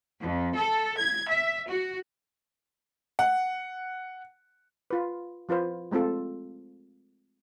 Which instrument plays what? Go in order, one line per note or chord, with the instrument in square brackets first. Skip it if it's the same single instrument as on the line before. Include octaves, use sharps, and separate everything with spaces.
[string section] F2
A4
G#6
E5
F#4
[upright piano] F#5
[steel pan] F4 B4
F3 F4 B4 C5
G#3 A3 C4 F4 A4